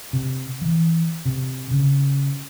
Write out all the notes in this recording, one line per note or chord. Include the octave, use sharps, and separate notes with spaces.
C3
E3
C3
C#3